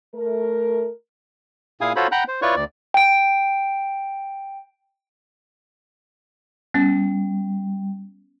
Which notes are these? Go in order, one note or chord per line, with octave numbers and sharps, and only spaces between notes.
A3 A#4
A#2 E4 G#4 F5 G#5 D#6
F4 F#4 A4 C5 C#5 B5
F#5 G5 A#5 B5 F#6 G6
C5
E4 F4 B4 C#5 D5 C#6
D2 D5
G5 D7
G3 B3 C#4